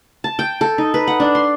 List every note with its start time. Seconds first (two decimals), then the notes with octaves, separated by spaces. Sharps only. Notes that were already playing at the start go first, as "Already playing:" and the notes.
0.24 A5
0.39 G5
0.61 A4
0.78 D#4
0.94 B4
1.07 F#5
1.20 D4
1.35 C6